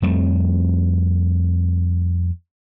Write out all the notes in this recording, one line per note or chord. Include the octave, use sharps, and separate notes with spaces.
F2 G3 A3 C4